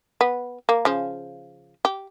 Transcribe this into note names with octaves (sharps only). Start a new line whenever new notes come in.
B3
A#3
C#3 F3
G4